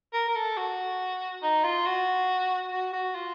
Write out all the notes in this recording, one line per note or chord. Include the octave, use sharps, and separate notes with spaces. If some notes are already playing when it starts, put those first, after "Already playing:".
A#4
A#4
A4
F#4
D#4
F4
F#4
F#4
F#4
F4